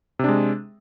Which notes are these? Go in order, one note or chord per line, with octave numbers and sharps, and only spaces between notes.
C3 G#3 D4